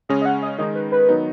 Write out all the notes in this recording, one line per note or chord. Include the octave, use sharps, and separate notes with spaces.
C#3 G#3 C#4 D#5
D#5
F#5
D#5
D#3 G#3 D#4 D#5
B4
B4
D#3 F#3 B3 D#4